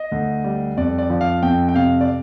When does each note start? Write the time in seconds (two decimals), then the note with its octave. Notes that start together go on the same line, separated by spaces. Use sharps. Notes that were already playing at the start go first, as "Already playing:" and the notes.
Already playing: D#5
0.12 D2
0.44 G3
0.77 F2 D5
0.98 D5
1.10 F3
1.21 F5
1.42 F2 G5
1.69 G5
1.75 C3 F5
2.01 D5